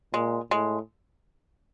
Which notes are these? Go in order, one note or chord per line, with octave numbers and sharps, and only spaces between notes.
A#2 G#3
A2 G#3